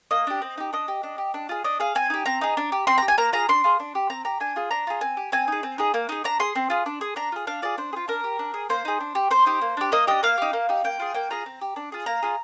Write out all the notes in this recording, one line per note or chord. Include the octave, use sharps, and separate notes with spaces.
A#3 D#5
D4 G4
C4
D#4 G4
D4 D#5
G4
D4
G4
D4
F4 G#4
D4 D#5
G#4 F5
C4 G#5
D#4 G4
C4 A#5
D#4 G#4
D4
G4
C4 C6
G4 A#5
G#5
A#3 A#5
F4 G#4 A#5
D4 C6
F4 G#4
D4
G4
C4 A#5
G4 A#5
D4 G#5
F4 G#4
D4 A#5
F4 G#4
C4 G#5
G4
C4 G#5
D#4 G#4
C4
D#4 G#4
A#3
D#4 G#4
D4 A#5
G#4 C6
C4
F4 G#4
D4
G#4
D4 A#5
F4 G#4
D4 F5
F4 G#4 D5
D4 C5
G#4
F4
D4 A#4
G4
D4
G#4
A#3 C5
D#4 G#4
D4
G4
C4 C5
D#4 G4
A#3
D4 G4
A#3 D#5
D4 G4 D#5
A#3 F5
D#4 G4
A#3
D#4 G4
A#3 G5
F4 G#4
A#3 G5
F4 G#4 A#5
C4
G4
D4
F4 G#4
A#3 A#5
F4 G#4